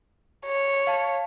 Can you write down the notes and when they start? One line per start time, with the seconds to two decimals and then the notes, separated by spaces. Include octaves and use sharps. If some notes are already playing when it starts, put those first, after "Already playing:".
0.47 C#5
0.87 F5 A5